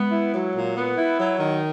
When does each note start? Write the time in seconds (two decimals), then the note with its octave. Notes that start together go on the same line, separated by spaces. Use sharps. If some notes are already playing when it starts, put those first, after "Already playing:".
Already playing: G#3 B3
0.11 E4
0.33 F#3
0.55 A#2
0.76 B3
0.97 E4
1.18 F#3
1.39 D#3